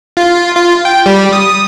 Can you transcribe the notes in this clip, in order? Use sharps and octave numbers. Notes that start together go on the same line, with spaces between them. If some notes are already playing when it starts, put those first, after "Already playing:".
F4
F4
G5
G3
D#6